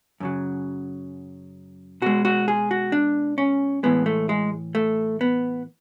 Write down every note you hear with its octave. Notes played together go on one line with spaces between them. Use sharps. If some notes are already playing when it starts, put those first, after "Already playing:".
F#2 C#3 F#3
B2 G#3 F#4
F#4
G#4
F#4
D4
C#4
A2 E3 G#3 B3
A3
G#3
A3
B3